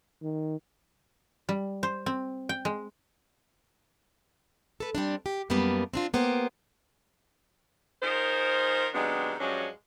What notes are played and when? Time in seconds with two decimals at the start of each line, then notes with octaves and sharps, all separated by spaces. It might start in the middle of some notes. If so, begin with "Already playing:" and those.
0.23 D#3
1.49 G3
1.83 C5
2.06 C4
2.49 G5
2.65 G#3
4.80 A4 B4
4.95 G3 C4 D4
5.26 G4
5.50 F#2 G3 A#3 B3 D4
5.93 C4 D4 F4
6.14 A#3 B3 G4 C5
8.03 D#3 F4 G#4 A#4 C5
8.94 C3 D#3 F#3 G#3 B3 D4
9.40 G2 F3 F#3 G#3 C#4 D4